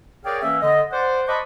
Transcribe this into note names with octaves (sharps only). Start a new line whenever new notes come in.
G#4 A#4 C#5 D5 F5 G5
E3 A#3 C#4 E5
D3 D#5
C5 D5 F#5
C5 D#5 A5 B5 C#6 D6